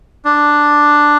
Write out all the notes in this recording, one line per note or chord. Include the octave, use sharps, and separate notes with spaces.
D4